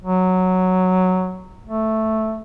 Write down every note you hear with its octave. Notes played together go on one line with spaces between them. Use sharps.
F#3
A3